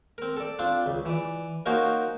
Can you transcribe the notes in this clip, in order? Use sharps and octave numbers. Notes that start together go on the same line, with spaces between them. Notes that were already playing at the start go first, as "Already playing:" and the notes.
C4 A#4
A4 D5
C4 D4 F4
C#2
E3 D5
A#3 C#4 D#4 F#4 A#4 C5